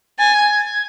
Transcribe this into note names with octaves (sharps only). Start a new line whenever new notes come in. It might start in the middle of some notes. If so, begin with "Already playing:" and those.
G#5 A6
G#6
G#6
G#6